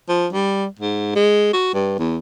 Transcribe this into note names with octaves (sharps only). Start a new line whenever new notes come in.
F3
G3
G#2
G#3
F#4
G2
E2